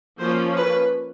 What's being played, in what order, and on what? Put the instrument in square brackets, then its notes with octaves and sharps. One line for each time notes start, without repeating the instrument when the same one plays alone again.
[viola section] F3 A#3 C#4 C5
B4